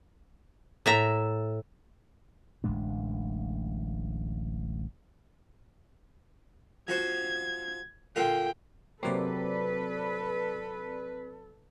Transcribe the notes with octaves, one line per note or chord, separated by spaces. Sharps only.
A2 E5 A#5
D1 A1 G#3 D4
F3 F#4 C5 G#6
A#2 D3 F4 G5
C3 F#3 A#3 C4 A4 B4 D5